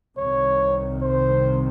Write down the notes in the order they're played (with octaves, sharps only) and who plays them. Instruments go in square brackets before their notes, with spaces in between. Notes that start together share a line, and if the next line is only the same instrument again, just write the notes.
[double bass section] C2 C3 D#3 [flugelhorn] C#5
[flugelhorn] C5